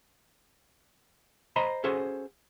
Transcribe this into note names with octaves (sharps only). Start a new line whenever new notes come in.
C5 D#5 A#5 B5
C#4 F#4 G#4 A4 C5